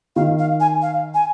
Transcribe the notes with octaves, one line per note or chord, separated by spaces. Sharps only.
D#3 F5
F5
G#5
F5
G#5